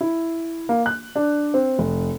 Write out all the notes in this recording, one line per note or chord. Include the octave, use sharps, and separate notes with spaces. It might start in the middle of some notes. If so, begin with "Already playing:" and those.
E4
A#3
F#6
D4
C4
F1